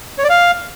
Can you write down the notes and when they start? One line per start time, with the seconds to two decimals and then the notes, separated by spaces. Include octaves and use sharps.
0.18 C#5
0.24 D5
0.29 F5